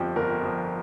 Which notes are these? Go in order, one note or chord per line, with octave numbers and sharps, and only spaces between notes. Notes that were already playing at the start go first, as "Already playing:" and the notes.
Already playing: G1 F2 F3 G4
G1 A#4
F2 F3